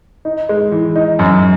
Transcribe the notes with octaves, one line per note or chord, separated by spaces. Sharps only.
D#4
G#3
E3
D#4
F#2